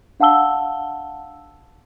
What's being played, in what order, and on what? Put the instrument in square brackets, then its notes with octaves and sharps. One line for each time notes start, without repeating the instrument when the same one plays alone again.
[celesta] D4 F5 F#5 A5 E6 G7